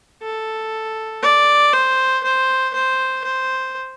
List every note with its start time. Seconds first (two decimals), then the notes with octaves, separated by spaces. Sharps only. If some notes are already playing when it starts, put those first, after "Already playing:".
0.22 A4
1.22 D5
1.73 C5
2.23 C5
2.74 C5
3.24 C5